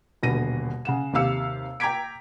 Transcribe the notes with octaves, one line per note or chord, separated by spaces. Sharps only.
D#1 B2 D3 A#6 D#7
C#3 F#5 E7
D#2 C3 G4 F5 E6 C#7
G5 A#5 D6 G#6 B6 D7